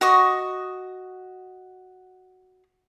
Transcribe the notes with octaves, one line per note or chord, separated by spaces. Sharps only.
F#4 D#5 C#6 D#6